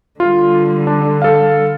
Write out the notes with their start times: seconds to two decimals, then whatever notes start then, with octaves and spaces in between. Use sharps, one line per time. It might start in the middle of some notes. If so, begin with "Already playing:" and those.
0.20 D3 G3 F4
0.87 D4
1.22 A4 F5